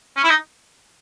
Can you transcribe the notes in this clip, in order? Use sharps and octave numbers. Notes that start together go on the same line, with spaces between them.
C#4
E4
D#4